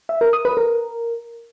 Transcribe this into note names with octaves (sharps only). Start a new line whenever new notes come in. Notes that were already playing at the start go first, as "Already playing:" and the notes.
E5
A#4
D#6
B4
A#4